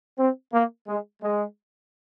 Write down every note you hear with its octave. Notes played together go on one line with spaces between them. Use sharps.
C4
A#3
G#3
G#3